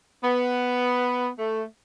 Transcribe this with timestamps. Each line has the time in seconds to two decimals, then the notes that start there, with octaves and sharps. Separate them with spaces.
0.24 B3
1.39 A3